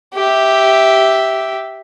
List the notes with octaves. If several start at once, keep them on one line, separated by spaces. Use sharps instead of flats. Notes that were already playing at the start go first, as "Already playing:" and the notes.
G4 E5